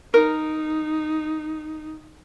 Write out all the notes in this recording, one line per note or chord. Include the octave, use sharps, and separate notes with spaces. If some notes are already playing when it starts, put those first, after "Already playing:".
D#4 A#4